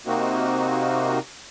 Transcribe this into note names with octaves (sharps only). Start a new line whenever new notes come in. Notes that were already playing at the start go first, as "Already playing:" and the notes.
C3 A#3 C4 D#4 F#4